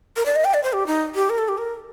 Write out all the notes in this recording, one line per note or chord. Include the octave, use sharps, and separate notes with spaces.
A#4
D5
D#5
G5
D5
C5
G4
D#4
G4
A#4
A4
G4
A#4